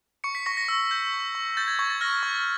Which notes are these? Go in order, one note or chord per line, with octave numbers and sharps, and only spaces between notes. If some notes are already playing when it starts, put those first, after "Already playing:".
C#6 C#7
B6
C#6 A#6
A#6
E6
G6
C#6
C#6
G6 A6
G#6
C#6 G#6
A6
F6 A#6
C#6